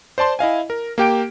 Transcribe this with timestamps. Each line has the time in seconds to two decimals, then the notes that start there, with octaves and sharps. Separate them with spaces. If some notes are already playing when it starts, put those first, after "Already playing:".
0.18 C5 D5 A5 C6
0.39 E4 D#5 F5 G#5
0.70 A#4
0.98 A#3 G4 G5 D7